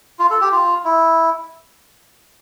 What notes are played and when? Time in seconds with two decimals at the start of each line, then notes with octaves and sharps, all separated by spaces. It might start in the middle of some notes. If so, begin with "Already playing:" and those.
0.19 F4
0.30 A4
0.41 G4
0.52 F4
0.85 E4